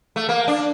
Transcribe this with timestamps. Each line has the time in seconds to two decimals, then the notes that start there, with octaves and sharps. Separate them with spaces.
0.16 A3
0.29 A#3
0.48 D4